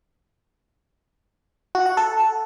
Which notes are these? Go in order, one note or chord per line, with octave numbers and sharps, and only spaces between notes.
F#4
F#5
A4